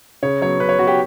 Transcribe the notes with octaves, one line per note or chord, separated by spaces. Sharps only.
C#3 C#5
F#3 B3 C#5
C#3 B4
C#5
F#3 B3 F#4
G4